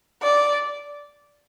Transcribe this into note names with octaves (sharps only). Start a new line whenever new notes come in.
D5